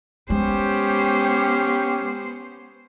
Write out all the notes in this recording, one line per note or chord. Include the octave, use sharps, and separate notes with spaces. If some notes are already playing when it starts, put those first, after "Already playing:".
G#3 B3 C#4 G4 C5